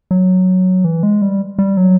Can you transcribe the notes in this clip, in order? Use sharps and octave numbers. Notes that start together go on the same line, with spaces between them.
F#3
E3
G#3
G3
G3
F#3